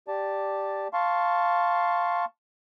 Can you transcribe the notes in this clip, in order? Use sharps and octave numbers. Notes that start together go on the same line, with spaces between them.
G4 D5 A5
F5 A5 C6 C#6